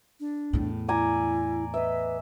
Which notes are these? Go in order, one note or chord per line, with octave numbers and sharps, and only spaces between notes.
D4
E2 A2
E4 D5 G#5 A#5
B4 D#5 E5